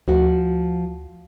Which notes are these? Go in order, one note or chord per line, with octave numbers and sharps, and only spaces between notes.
D2 F3 F#4